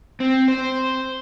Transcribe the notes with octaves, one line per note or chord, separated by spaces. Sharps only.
C4
C5